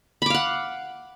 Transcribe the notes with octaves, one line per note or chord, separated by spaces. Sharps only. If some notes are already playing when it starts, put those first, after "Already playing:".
F5 F#5 B5 D6